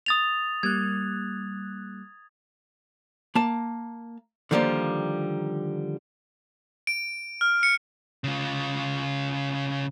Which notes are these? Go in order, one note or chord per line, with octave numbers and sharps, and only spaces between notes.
D#6 A6 F7
G3 A#3 F#6 G#6
A#3 A5
D3 D#3 F3 G3 A3 A#3
D7
F6
C#7
C#3 F4